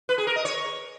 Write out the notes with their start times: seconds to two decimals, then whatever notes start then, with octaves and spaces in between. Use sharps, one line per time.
0.09 B4
0.18 G#4
0.27 A#4
0.36 D#5
0.45 C#5